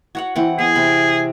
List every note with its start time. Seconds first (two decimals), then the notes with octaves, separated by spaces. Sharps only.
0.15 F#4 C#5 F#5
0.36 E3 C4 F#5
0.59 B3 G#4
0.75 C3 C4 B5